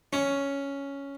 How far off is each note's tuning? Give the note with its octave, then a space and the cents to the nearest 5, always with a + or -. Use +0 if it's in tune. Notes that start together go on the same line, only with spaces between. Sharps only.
C#4 +5